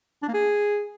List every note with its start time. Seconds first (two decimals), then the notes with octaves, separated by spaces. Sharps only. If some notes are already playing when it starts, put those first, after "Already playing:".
0.22 D4
0.28 A#3
0.34 G#4